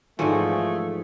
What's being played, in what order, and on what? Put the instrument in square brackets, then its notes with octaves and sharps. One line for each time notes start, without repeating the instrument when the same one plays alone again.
[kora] G#2 E3 F#4 [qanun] F3 D5 [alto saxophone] A3 [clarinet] G#4